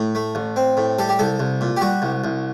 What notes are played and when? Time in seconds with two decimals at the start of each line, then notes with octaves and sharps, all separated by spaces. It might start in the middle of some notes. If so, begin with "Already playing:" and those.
Already playing: A2
0.15 A3
0.35 A1
0.56 C4
0.77 A2
0.99 G3 A4
1.09 G4
1.19 C2 A4
1.40 C2
1.61 A#2
1.77 G4
1.81 G3 F#4
2.02 C2
2.24 C2